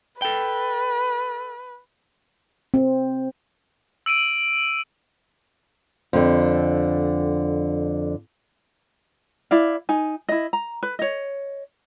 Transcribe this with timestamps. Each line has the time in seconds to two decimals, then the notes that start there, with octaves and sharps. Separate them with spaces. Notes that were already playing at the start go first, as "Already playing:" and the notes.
0.22 A4 B4 G5
2.74 C4
4.06 E6 D7 D#7 F#7
6.13 F2 D3
9.51 E4 D5 F5
9.89 D#4 G#5
10.29 E4 D#5
10.53 A#5
10.83 B4
10.99 C#5 D#5